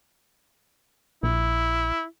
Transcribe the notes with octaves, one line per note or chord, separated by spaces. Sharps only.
A#1 E4